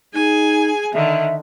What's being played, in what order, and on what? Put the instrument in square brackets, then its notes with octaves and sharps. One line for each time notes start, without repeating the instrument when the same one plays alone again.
[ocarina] D#4 [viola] G#4 G#5
[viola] D3 D#3 [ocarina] E5